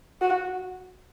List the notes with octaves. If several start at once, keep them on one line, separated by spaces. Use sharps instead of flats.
F#4